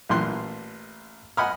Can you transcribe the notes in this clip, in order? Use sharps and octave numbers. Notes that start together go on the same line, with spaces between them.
A1 A#2 E3 C6 F#6
D#5 F#5 G#5 B5 D#6 F6